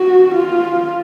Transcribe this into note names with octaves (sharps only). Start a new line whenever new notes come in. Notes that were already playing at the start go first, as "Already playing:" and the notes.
Already playing: F#4
F4